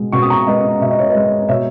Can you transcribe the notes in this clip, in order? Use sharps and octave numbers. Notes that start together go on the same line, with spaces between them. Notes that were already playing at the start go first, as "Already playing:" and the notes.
Already playing: B2 G#3
B2 C#6
D#6
A#5 C#6
G#3 B4 D#5
B2 E5
D#5
C#5
B4 D#5
G#3
B2 C#5 E5